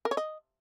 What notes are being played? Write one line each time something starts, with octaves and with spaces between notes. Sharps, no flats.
A#4
C#5
D#5